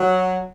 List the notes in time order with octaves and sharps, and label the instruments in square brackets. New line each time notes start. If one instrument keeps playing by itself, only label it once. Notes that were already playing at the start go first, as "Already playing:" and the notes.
Already playing: [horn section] F#3